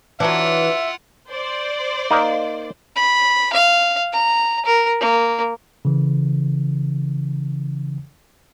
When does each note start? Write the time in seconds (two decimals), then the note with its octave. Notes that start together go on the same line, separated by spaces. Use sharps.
0.20 E3 F#3 C#4 D4 F4 E5 F#5
1.29 C5 D5
2.11 A#3 D#4
2.96 B5
3.53 F5
4.13 A#5
4.66 A#4
5.00 A#3
5.85 C#3 E3